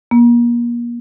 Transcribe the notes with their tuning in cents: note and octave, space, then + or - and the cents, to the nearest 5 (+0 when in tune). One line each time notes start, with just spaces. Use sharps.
A#3 +35